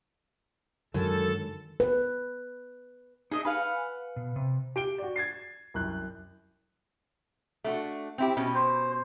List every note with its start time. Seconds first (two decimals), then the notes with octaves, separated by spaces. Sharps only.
0.94 F#2 D3 D#3 G#3 A4 A5
1.80 B4
3.31 D4 D#4 G#4 D#5 E5
3.45 B4 F5 F#5 G#5
4.16 B2
4.36 C3
4.76 G4 D7 G7
4.98 F#4 D5
5.16 G#6 A6 C7
5.74 C2 F#2 F#6 G6
7.64 A3 D4 F#4
8.18 C4 E4 G4
8.37 B2 C#4
8.55 C5